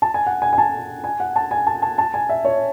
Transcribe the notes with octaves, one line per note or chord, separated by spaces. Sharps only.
A5
G#5
F#5
G#5
G#5
A5
G#5
F#5
A5
G#5
A5
A5
A5
G#5
E5
C#5